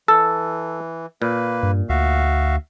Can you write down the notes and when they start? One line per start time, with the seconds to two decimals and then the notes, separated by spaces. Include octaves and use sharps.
0.08 E3 A4
1.22 A#2 A#3 B4
1.63 G2
1.89 D2 F#4 E5 F5